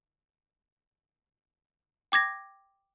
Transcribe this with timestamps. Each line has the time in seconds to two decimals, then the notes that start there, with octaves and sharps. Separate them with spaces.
2.12 G5 D6 G#6 A#6